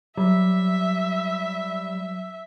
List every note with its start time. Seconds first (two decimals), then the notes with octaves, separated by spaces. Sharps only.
0.17 F#3 G3 E5